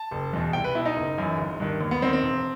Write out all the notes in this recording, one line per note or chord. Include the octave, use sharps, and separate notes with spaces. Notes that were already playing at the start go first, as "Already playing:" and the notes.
Already playing: A5
F#1
E2 B2
C2 G5
B4
B2 E4
D#4
F#1
F#2 E3
G1
G2 D#3
D#2
B3
D#3 C4
C4
E1